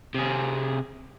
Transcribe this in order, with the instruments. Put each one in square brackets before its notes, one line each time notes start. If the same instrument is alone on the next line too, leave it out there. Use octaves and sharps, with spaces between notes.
[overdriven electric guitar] C3 G#4